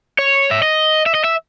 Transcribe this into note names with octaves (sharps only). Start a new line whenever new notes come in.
C#5
E5
D#5
E5
D#5
E5